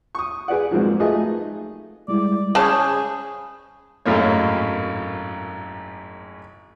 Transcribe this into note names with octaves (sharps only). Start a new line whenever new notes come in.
C#6 D#6
G#4 B4 D5 F#5
G#2 F3 F#3 G#3 A#3 C4
A3 D#4 F4 G#4 B4 D#5
G3 G#3 E4 D5
C#3 G#4 C5 C#5 F5 A5 B5 G6
G#1 F#2 A2 A#3 C#5